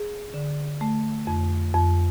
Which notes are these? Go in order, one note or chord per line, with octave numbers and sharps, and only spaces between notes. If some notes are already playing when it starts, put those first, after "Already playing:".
Already playing: G#4
D3
A3
F2
F2